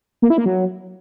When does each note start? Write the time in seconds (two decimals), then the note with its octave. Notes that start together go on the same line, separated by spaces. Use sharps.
0.22 A#3
0.30 E4
0.38 A#3
0.46 F#3